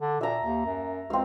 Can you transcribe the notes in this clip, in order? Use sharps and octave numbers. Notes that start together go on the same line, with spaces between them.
D3
A#2 E5 A#5
D#2
F#2
C#2 C4 F5